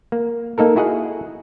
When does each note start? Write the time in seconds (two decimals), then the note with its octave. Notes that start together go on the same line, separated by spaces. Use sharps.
0.12 A#3
0.58 A#3 D#4 A4 A#4
0.76 E4 F#4 G#4 D#5 F#5